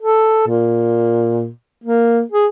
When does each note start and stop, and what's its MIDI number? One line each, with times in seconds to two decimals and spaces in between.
0.02 0.43 69
0.47 1.49 46
1.84 2.22 58
2.31 2.47 68